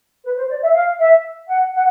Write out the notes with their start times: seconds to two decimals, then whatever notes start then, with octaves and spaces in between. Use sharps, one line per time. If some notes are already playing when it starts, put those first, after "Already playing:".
0.24 B4
0.37 C5
0.50 D5
0.62 E5
0.74 F5
0.99 E5
1.49 F#5
1.74 F#5